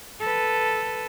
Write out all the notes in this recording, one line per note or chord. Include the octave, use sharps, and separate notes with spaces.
A4 B4